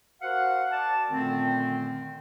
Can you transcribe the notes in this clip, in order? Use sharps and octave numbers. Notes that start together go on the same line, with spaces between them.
F#4 A#4 C5 F5 F#5
D5 A5
F#2 A#2 D3 D#3 A3 C4